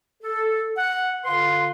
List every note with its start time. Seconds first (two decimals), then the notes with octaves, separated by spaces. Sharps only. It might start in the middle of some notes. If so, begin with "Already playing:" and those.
0.22 A4
0.77 F#5
1.25 D3 F4 B4 F5 C6